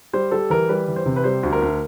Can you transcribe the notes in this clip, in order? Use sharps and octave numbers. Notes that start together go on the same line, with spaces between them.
G3 C5
G3 A4
E3 A#4
G3 B4
E3
C5
C3
B4
G3 C5
D2
A#4
D2